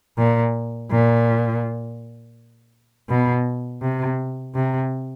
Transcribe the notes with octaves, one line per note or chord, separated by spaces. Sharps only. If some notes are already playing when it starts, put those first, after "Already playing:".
A#2
A#2
B2
C3
C3